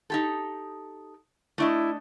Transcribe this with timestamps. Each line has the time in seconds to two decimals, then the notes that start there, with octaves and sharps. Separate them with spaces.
0.10 D#4 G4 A4
1.58 A3 D4 E4 D#5